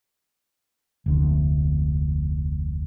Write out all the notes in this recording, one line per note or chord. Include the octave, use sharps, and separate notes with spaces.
F1 D2